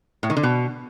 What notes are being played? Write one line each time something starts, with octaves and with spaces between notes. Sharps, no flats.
A2
D#3
D3
B2